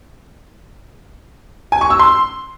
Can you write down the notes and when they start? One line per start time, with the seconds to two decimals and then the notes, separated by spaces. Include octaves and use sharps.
1.72 G#5
1.81 C#6
1.90 E6
1.99 C6